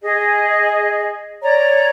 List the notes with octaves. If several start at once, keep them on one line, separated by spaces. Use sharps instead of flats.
G#4 D#5
C#5 D5 A#5